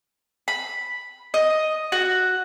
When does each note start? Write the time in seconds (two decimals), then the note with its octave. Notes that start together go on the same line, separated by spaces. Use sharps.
0.48 B5
1.34 D#5
1.92 F#4